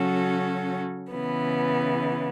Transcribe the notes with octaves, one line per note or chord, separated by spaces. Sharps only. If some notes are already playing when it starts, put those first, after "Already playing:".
Already playing: C#3 F#3 C#4 F#4 A4
C#3 E3 B3